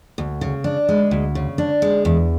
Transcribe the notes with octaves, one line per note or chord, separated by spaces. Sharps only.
D2
C#3
D4
G#3
D2
C#3
D4
G#3
E2